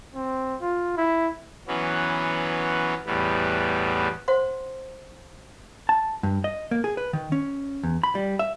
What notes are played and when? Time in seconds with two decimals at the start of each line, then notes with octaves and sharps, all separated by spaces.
0.14 C4
0.61 F4
0.97 E4
1.68 E3 F#3 B3 C#4
3.06 E2 A2 G3 B3
4.28 C5 F#5 C6
5.89 A5
6.23 G2
6.44 D#5
6.71 A#3
6.84 G#4
6.97 B4
7.13 D#3
7.32 C#4
7.83 E2
8.03 B5
8.15 G3
8.39 E5